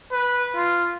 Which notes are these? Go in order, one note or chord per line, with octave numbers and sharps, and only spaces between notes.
B4
F4